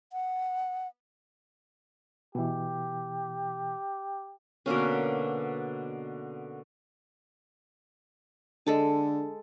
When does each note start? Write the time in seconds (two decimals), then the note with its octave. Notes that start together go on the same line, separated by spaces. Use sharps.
0.13 F#5
2.35 B2 E3 G4
4.66 B2 D3 A#3 C#4
8.67 D3 G#3 A4 A5